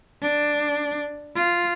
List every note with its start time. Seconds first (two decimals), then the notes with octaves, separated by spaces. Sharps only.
0.22 D4
1.36 F4